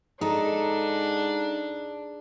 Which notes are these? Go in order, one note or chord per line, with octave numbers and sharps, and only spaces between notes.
G#2 D4 D#4 G#4 A4 A#5